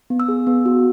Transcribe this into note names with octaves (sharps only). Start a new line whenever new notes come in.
B3
E6
G#4
B3
F#4